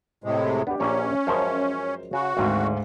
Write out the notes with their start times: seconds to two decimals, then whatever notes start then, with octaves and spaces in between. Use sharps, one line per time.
0.24 A2 C3 G#3
0.67 B3 D4 G4
0.80 A#1 A#3 C#4 C#5
1.27 F#2 F3 G#3 A#4 C5
2.13 C#3 F#4
2.37 G#1 D2 G#2 C4 F5